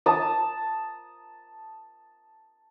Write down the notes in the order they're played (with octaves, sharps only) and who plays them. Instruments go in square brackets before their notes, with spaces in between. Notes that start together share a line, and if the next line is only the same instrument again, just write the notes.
[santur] A5 D#6